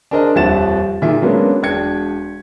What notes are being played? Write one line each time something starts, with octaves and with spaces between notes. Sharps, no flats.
D4 G#4 A#4 C5 D#5
D#1 F2 E5 F#5 A6 E7
A#2 D#3 G#4 E5
F#3 G#3 A#3 B3 C#4 D4
E1 D4 G5 G#6 C#7